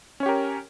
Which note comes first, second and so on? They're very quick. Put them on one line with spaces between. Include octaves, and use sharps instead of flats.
C#4 C#5 G4 A#4